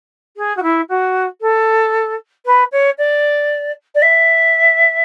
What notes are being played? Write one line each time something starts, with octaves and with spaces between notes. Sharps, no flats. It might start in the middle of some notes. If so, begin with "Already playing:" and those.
G#4
F#4
E4
F#4
A4
B4
C#5
D5
D5
E5